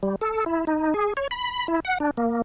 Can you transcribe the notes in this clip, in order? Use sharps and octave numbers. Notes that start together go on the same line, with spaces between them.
G3
A4
E4
D#4
G#4
C#5
B5
E4
F#5
D4
A#3